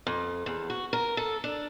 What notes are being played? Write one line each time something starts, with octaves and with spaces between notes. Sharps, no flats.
F2
E2
F#4
A#4
A4
D4